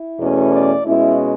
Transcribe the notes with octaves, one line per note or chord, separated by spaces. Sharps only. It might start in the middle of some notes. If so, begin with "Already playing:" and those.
Already playing: E4
E2 B2 A3 C#4
D5
B2 G#3 C#4 E4